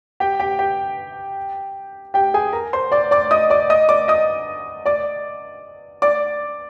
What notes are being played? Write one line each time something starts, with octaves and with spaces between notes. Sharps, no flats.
G4 G5
G4 G5
G4 G5
G4 G5
G#4 G#5
A#4 A#5
C5 C6
D5 D6
D5 D6
D#5 D#6
D5 D6
D#5 D#6
D5 D6
D#5 D#6
D5 D6
D5 D6